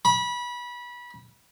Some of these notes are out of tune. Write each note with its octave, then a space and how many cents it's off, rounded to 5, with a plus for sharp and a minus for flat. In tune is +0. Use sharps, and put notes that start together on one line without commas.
B5 -25